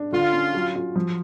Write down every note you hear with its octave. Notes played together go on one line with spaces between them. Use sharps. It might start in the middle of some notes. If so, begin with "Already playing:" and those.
Already playing: D4
D3 F4
C#4
F#3
F4
F3